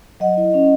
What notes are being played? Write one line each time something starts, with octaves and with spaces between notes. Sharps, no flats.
F#3 D#5 F#5
E4
C#4